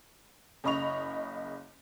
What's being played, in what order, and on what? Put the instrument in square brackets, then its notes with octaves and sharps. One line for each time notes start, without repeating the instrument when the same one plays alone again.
[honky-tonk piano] F#1 C#3 D#5 B5 C#6 F7